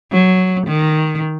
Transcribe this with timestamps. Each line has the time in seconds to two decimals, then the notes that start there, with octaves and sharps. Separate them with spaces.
0.12 F#3
0.67 D#3